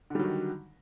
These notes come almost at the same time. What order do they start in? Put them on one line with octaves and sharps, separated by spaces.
D3 G3 F#3 D#3